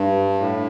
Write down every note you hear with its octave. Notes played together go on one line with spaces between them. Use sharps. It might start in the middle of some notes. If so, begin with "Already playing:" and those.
Already playing: G2
A2